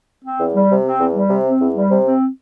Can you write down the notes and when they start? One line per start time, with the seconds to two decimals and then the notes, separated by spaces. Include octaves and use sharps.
0.24 C4
0.38 E2
0.53 G3
0.70 C3
0.84 C4
0.99 E2
1.14 G3
1.29 C3
1.45 C4
1.60 E2
1.74 G3
1.90 C3
2.05 C4